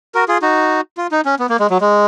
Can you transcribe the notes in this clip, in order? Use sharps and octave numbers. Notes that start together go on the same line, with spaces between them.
F#4 A#4
F4 G#4
D#4 F#4
F4
D#4
C#4
B3
A#3
G#3
F#3
G#3